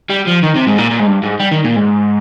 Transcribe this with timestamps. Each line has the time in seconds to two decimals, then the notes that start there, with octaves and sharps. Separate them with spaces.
0.09 G3
0.27 F3
0.43 D#3
0.55 C3
0.67 G#2
0.78 A#2
0.91 A#2
1.00 G#2
1.07 G2
1.23 G#2
1.40 G3
1.51 D#3
1.64 A#2
1.76 G#2